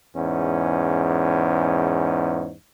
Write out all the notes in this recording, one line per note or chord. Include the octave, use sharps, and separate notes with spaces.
E2 G#2 C#4